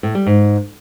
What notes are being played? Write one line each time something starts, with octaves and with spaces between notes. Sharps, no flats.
A2
G3
G#2